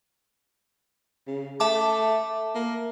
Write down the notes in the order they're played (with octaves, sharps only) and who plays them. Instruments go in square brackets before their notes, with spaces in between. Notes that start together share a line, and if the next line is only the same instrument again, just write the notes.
[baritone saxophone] C#3
[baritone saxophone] A3 [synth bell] E5 A5 D6
[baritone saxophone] A#3